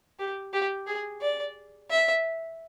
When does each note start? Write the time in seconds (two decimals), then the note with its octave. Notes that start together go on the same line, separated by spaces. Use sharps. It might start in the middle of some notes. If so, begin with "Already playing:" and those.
0.19 G4
0.53 G4
0.87 G#4
1.21 D5
1.90 E5